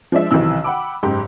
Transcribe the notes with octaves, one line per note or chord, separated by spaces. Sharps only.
F3 G#3 D4 E5
B1 C3 D#3 E3 E6
F#5 G5 B5 D6
F#1 G#2 G4